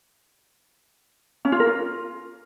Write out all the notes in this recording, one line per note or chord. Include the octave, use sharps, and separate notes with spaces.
C#4
F4
A#4
F4